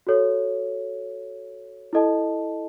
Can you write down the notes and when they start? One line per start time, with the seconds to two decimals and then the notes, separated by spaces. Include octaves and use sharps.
0.07 F#4 A4 C#5
1.93 E4 A4 D#5 A5